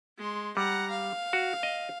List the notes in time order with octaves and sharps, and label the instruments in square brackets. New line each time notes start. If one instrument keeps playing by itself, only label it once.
[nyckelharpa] G#3 C6
[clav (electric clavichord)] G3 [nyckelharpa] F#5 A#5
[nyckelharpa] F5
[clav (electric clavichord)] F#4
D#5